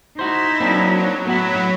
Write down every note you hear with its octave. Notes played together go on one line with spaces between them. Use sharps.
D#4 E4 F#4 C5
F#3 A#3 C4 D4
A2 F#3 B3 E4 F#4